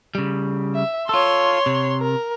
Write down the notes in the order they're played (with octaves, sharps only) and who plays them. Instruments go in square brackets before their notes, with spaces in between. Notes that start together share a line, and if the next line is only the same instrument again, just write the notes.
[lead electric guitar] C#3 G3
[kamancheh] E5
[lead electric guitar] F4 A4 [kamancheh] C#5 C6
[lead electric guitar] C3
[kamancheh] A#4